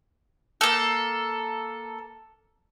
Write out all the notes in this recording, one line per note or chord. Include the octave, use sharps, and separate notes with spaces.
A#3 A4